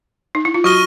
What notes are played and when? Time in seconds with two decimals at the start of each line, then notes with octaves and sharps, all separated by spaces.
0.35 D#4
0.45 E4
0.54 F4
0.64 F#3 F#4 C#6 F6 A#6 D#7 G7